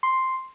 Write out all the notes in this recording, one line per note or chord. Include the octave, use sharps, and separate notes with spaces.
C6